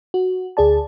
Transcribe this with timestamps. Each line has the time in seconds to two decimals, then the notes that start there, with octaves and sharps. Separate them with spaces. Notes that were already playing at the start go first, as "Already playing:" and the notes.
0.14 F#4
0.57 D2 G#4 D5 A5